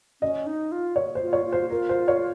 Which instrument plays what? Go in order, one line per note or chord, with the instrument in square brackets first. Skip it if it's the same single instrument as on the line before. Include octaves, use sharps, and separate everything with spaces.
[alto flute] C#4 [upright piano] D#5
[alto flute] D#4
F4
[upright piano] C#5
C5
[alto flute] F4
[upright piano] C#5
[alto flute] F4
[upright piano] C5
[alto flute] F4 [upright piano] A#4
[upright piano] C5
C#5